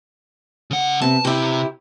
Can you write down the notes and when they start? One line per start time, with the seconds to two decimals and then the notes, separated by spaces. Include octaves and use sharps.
0.71 C#3 F#5
1.02 C3 B3 A5
1.25 C3 E4 G4